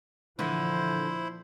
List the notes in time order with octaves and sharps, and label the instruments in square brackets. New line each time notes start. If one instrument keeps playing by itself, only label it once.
[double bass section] A#2 F3 [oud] D3 E3 [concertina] E4 C5